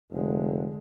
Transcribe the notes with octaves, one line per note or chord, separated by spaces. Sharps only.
F1 D3 G#3